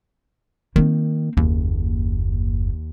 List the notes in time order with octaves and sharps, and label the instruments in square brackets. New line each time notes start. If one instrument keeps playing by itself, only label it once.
[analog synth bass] D#3 [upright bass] A#3 C4
[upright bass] F#1 [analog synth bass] D#2